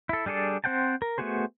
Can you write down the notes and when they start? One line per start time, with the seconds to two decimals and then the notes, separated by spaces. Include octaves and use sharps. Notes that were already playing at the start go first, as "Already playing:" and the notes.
0.09 E4 A4
0.26 G3 D4 G#4 A4 D5
0.64 C4 C5 F#5 G5 A5
1.02 A#4
1.18 A3 B3 F#4 G#4 C5